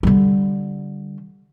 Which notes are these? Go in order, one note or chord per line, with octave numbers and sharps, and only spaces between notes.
D3 G3